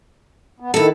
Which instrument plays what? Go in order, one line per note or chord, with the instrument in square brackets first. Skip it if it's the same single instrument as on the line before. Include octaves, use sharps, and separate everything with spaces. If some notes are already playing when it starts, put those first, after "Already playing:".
[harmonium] B3
[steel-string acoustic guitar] D2 A4 [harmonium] D#3 E4